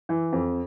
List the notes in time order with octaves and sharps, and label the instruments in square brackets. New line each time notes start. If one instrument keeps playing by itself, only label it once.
[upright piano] E3
F2